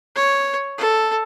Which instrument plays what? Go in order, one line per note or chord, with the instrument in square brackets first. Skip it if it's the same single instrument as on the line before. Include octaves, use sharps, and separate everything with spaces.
[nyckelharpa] C#5
A4